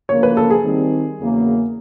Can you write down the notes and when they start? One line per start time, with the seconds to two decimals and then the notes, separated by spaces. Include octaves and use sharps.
0.09 D2 C#3 F3 A#3 C#5
0.23 B4
0.37 A4
0.50 G#4
0.63 D#3 G3 C4
1.19 E2 C#3 F#3 A#3